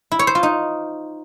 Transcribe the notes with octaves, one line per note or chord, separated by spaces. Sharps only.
E4
C#5
C5
F4
D#4